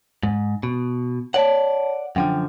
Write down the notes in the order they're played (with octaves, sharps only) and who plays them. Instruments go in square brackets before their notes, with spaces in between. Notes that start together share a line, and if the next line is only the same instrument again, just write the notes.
[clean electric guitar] G#2
B2
[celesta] C#5 A5 [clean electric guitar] D5 F#5
[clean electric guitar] F#2 D3 F3 [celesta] F#5 G5